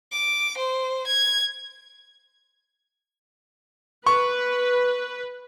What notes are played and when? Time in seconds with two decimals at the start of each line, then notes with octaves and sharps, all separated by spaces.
0.12 D6
0.57 C5
1.07 G#6
4.06 B4 C#6